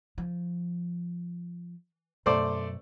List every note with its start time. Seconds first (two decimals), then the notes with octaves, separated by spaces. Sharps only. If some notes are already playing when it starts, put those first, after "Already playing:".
0.18 F3
2.26 F#2 B2 A3 C5 D5